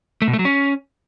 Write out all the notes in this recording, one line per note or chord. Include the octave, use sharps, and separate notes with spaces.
A3
B2
A3
F#3
C#4